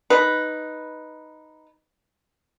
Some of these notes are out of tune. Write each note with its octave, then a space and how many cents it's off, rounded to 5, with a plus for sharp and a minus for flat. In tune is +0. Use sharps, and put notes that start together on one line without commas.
D#4 +0 B4 +0